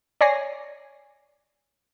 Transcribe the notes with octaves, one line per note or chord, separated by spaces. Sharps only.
C#5 D5 G#5 A#6 C7